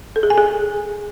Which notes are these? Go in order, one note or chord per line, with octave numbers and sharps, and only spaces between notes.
A4
G#4
G#5
G#4